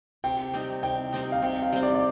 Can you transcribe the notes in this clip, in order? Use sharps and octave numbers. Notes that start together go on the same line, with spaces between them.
C3 G5
G3 C4 D#4
C3 G5
G3 C4 D#4
F5
C3 G5
F5
G3 C4
D5
D5